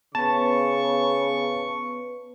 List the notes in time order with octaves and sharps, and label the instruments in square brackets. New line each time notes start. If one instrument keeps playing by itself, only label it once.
[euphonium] C#3 [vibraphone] B3 B4 [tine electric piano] A5 [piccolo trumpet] C#6